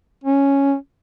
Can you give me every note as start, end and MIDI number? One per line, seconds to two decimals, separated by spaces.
0.24 0.74 61